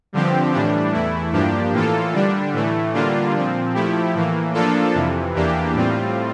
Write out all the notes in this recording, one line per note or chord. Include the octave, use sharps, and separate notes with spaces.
G2 D3 F3 C4 G4
A2 E3 G3 D4
E2 E3 A3 E4
G2 F3 A#3 D4 G4
A2 E3 A#3 F4 A4
D3 G3 D4
A2 E3 A3
D3 G3 A#3 D4 F4
A#2 F3 C4
F3 A3 E4 G4
A2 E3 A#3
F3 A#3 D4 F4 A4
F2 C3 E3
E2 E3 A#3 D4 G4
A2 G3 C4 F4